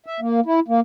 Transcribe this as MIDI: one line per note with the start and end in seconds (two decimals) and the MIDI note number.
0.06 0.20 76
0.20 0.40 58
0.46 0.60 64
0.68 0.80 58